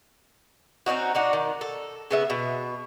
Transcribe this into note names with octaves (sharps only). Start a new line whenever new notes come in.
C4 C#4 D#4 F#4
D4 D#4 F#4
D#3
A4
C#3 B3 E5
B2